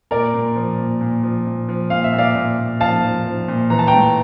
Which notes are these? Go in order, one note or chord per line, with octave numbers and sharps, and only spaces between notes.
A#2 A#4 D5
A#2
F3
A#2
A#2
F3
A#2
F3
A#2 F5
E5
A#2
D5 F5
A#2
A#2
F3 F5 A5
F3
F3
A#2
E3 A#5
A5
G5 A#5
A2